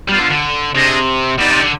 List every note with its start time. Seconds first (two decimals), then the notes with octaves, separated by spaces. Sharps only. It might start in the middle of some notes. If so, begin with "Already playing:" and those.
0.09 G3 B3 D4 F4
0.20 D3
0.31 D3
0.74 C3 D4 G#4 C5 D#5
1.39 B2 D#4 G4 D5
1.51 C3
1.61 D3